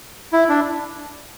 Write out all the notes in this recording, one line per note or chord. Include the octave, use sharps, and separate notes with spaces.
E4
D4